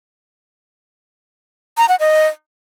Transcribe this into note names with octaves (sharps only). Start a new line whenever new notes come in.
A#5
F#5
D#5